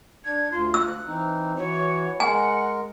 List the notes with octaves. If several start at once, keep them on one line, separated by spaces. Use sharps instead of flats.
D4 G#6
D2 F4 C6
E6 F#6
E3 C4 D#4
E3 F#4 C#5
G#3 A#4 F#5 G#5